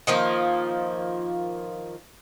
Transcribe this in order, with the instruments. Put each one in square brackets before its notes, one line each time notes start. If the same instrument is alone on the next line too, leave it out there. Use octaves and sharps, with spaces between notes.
[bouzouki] D#3 F3 A#3